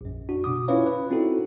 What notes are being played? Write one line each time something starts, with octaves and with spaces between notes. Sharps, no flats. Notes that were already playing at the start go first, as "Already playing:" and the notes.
A#1 F#2
D4 F#4
B2 D6 D#6
C#4 E4 F4 B4 C#5 F5
B4
C4 D#4 E4 F#4 A4